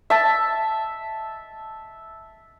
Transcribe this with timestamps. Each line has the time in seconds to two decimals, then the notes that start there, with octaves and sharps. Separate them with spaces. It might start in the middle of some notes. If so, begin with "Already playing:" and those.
0.10 E5 A5